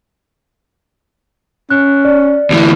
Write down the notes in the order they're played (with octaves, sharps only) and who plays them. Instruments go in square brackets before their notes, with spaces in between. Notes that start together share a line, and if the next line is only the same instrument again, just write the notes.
[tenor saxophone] C#4 [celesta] F#6
[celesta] D5
[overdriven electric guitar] D2 E3